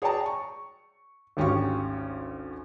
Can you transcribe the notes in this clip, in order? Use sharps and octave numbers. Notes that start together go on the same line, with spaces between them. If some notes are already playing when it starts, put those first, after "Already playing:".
G#4 C#5 D5 G5 A5 A#5
C#6
G#1 D2 C#4 G4 F5 C#6